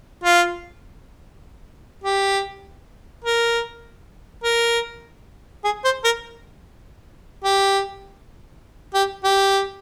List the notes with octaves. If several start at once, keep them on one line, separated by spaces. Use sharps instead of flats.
F4
G4
A#4
A#4
G#4
C5
A#4
G4
G4
G4